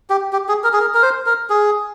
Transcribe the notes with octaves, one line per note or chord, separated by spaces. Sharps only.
G4
G4
G#4
A#4
G#4
A#4
A#4
C5
A#4
G#4